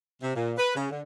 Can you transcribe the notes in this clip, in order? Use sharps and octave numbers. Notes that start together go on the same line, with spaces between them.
C3
A#2
B4
C#3
D3